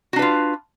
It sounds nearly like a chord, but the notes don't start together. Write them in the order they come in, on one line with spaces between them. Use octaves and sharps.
F#4 D4 B4 F4